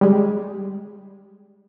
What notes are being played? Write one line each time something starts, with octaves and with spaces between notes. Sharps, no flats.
G3 G#3